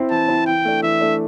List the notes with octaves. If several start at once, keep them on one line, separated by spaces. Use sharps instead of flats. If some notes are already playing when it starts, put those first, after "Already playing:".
Already playing: C4 E4 C5
E3 A5
C4 E4 C5
E3 G5
A3 D4
E3 E5
A3 D4